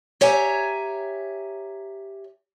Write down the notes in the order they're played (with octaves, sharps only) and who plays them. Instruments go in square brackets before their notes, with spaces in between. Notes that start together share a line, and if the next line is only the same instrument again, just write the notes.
[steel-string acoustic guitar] G4 C#5 E5 G#5 A#5